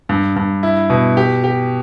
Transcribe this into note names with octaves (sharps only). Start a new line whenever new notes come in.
G2
G2
E4
B2
G4
G4